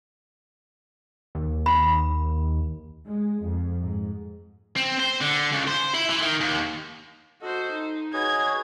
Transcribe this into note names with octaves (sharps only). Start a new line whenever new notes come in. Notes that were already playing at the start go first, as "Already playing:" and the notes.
D#2
B5
G#3
F2
G#2
C4
C5
D3
C#2
C5
E4
E3
D#3
D#2
F#4 A4 C5 D#5
D#4
F#4 G#4 B4 C#5 D#5 G#6